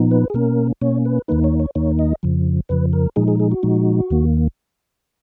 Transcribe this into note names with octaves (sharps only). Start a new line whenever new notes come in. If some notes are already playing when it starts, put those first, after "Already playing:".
Already playing: A#2 F3 B3 D#4
B4
G#4
B2 A#3 C#4 A#4
B2 A#3 C#4 C#5
B4
D#2 D#3 A#3 D#4 B4
C#5
C#5
D#2 D#3 A#3 D#4 C#5
D#5
F2 C#3 F3
F2 C#3 F3 B4
A#4
A#2 F3 G#3 D#4 G#4
G#4
G#4
F#4
A#2 F3 G#3 D#4
D#2 D#3 A#3